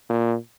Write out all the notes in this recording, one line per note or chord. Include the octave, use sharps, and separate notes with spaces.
A#2